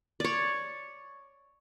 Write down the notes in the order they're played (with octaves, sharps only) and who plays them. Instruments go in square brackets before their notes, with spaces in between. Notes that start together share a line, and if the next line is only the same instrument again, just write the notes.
[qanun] C#5 D5